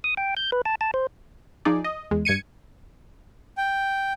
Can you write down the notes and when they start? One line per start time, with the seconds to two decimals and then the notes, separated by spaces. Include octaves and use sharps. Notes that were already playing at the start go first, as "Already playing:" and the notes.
0.04 D#6
0.17 G5
0.37 G6
0.52 B4
0.65 A5
0.81 A5
0.94 C5
1.65 F3 D#4 G#4 D5
1.84 D#5
2.11 E2 G#3
2.25 G2 G#6 C#7 D#7
3.57 G5